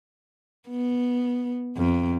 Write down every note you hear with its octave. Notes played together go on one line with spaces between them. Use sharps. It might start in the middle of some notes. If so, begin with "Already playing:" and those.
B3
F2